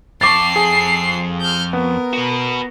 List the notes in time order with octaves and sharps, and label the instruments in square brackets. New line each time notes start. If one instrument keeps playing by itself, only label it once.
[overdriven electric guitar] F2 A4 [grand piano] C#6 D6 A6 [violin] C7
[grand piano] G#4
[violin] F6 G6
[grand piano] B3 [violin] A#4
[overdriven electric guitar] F#4 B4